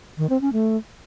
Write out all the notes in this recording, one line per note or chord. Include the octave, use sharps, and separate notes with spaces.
D#3
C4
C#4
A3